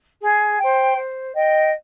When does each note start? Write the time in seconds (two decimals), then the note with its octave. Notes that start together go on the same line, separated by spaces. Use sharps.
0.21 G#4
0.59 C5 G5
0.96 C5
1.34 D#5 G5